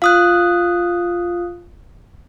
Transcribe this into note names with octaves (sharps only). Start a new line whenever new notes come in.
F4 F5 D#6 F#6